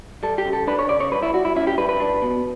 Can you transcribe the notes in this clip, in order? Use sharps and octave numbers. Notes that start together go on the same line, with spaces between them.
G3 A4
G4
C#3
A4
D4 B4
C#5
C#3 D5
C#5
G3 B4
E4
G3 F#4
E4
C#4 E4
G4
G3 B4
B4
D4
B2